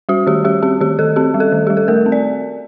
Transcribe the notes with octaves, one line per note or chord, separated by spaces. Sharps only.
G3 F#4
D#3 G4
G3 G4
C4 G4
D#3 G4
D#3 A4
C4 G4
G3
A4
D#3
G3 G4
A4
A3 A#4
C4
D5